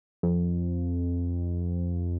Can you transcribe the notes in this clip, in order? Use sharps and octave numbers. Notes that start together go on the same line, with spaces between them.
F2